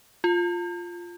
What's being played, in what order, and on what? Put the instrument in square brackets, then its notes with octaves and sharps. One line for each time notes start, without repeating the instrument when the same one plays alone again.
[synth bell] F4